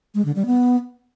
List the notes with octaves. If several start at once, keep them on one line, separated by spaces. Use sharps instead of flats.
G#3
D3
G3
B3